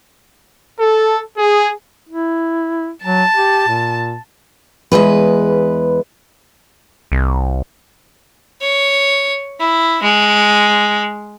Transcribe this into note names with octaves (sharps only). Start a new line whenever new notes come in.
A4
G#4
E4
F#3 A5
G4
A#2
E2 G#2 G#3 B4
C2
C#5
E4
G#3